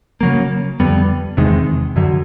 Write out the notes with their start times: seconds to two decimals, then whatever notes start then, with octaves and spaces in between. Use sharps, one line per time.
0.21 C#3 F#3 A#3
0.80 F2 D3 G3 B3
1.37 E2 C3 D#3 G#3
1.96 F#2 D3 F#3